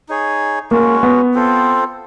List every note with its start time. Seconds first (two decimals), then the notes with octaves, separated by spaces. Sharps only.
0.09 D#4 G#4 C#5
0.71 G#3 A#3 C#4 F#4
1.03 B3
1.34 C4 F4 A4 C5